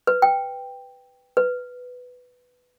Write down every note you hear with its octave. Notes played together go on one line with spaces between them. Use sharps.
B4
G5
B4